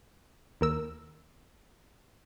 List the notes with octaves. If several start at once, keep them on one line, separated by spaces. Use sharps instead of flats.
D#2 A#4 E6